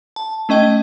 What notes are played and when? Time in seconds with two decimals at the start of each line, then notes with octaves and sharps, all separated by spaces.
0.16 A5
0.49 A3 C#4 D#5 G5